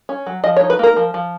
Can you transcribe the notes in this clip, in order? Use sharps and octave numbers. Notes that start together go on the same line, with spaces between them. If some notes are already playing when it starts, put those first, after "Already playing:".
C#4
F#3
F3 D#5
C#5
D#4
B4
A#3 A#4
F3
F3